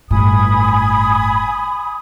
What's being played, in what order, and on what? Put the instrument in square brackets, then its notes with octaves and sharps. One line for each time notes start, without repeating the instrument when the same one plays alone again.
[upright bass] G1 A2 [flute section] G#5 B5 D#6